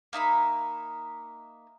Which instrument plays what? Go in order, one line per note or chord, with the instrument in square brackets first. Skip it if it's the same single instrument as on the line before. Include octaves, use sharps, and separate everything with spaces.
[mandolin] A#3 D#4 E5 B5